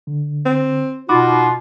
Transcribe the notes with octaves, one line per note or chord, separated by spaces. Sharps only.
D3
C4
B2 D#4 F4 F#4 B5 D6